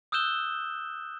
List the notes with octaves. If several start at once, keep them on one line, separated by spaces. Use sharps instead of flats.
D#6 E6 F#6 G6 E7 G7